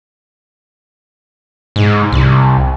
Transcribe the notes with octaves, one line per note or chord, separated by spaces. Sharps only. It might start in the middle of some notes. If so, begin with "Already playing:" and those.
G#2
C2